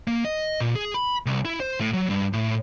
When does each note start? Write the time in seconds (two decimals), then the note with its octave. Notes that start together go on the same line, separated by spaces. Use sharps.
0.08 A#3
0.25 D#5
0.60 A#2
0.76 G#4
0.94 B5
1.26 C2
1.45 E4
1.60 C5
1.80 A2
1.93 F#3
2.10 G2
2.33 A2